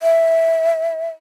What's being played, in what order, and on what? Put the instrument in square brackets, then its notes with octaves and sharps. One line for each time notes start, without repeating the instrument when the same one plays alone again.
[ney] E5